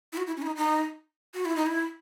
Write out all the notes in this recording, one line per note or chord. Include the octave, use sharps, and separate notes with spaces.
E4
F#4
E4
C#4
E4
D#4
D#4
F#4
E4
D#4
E4